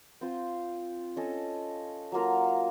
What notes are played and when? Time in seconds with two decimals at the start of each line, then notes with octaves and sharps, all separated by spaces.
0.21 C4 F4 C5
1.16 C#4 A4 D#5
2.12 F#3 A#3 F4 A#4